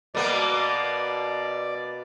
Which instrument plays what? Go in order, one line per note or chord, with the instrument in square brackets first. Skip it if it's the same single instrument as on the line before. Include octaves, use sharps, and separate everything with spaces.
[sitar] B2 A#3 B3 [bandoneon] D5